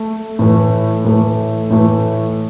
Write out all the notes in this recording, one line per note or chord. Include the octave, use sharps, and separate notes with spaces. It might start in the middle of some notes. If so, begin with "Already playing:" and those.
Already playing: A3
A2 E3 A3
A2 E3 A3
A2 E3 A3